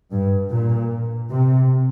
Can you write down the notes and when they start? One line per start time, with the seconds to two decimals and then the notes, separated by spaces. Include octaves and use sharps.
0.12 G2
0.51 A#2
1.31 C3